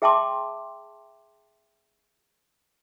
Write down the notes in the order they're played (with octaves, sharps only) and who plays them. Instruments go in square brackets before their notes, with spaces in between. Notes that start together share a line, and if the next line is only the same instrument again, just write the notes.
[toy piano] G#4 E5 G5 A5 C6 D6